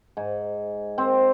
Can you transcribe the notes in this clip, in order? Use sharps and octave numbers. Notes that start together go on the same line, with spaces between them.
G#2
C4